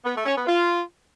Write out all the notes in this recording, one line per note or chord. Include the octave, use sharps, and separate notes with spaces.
B3
A3
C#4
B3
F4